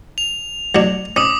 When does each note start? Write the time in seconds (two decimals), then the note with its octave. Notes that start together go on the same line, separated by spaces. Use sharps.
0.18 F7
0.75 F#3 D4
1.16 C#4 D6 D#6